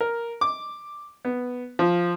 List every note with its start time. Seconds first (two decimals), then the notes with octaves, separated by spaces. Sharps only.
0.01 A#4
0.41 D6
1.25 B3
1.79 F3